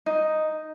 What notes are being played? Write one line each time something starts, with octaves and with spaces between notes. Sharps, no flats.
D#4